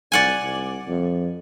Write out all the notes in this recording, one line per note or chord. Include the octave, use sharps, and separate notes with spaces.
C2 D5 F#5 G#5
C2
F2